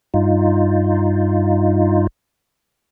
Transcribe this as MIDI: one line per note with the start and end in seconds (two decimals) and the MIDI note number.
0.14 2.07 43
0.14 2.07 63
0.14 2.07 65